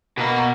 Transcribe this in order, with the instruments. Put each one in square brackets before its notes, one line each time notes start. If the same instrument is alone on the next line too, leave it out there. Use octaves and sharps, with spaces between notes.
[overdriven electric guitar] B2 [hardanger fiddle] A#3